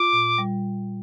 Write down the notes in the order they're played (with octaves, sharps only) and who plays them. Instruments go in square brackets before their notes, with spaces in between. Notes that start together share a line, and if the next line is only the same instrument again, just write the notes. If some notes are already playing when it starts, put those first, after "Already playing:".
Already playing: [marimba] F4 [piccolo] D6
[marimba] A#2
G3